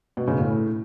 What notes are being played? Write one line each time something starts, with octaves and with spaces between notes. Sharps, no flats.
B2
C#3
A2